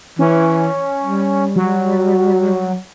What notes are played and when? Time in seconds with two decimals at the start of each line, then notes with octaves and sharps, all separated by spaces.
0.19 E3 C#4
1.03 G3
1.56 F#3